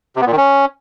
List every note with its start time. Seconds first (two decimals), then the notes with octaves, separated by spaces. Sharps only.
0.16 C3
0.22 B3
0.27 A#2
0.32 D#3
0.37 C#4